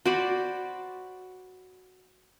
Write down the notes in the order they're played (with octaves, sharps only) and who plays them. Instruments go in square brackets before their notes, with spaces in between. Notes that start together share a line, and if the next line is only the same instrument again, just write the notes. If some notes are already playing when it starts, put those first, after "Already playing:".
[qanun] F#4 C5 D5 B5